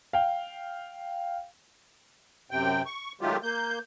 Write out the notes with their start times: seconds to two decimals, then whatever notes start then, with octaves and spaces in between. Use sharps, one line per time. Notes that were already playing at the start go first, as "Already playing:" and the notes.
0.13 F5 G5
2.51 F#2 C3 G5
2.86 C#6
3.21 D#3 F#3 G#3 A3 F4 G4
3.43 A#3 G6